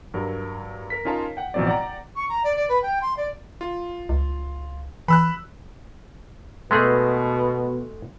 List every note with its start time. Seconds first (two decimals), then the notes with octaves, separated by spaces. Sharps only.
0.14 G2 F#3 A#4
0.90 A#4 B6
1.05 C#4 D#4 F4 A#4 A5
1.37 F#5 G5
1.54 A1 B2 F3 F#3 C4 D5
1.67 D5 F#5 G5 A#5
2.16 C#6
2.29 A#5
2.44 D5
2.56 D5
2.69 B4
2.83 G5
3.02 C6
3.17 D5
3.61 F4
4.09 C#2
5.08 E3 B5 E6 F#6
6.71 B2 G#3 A3 G#4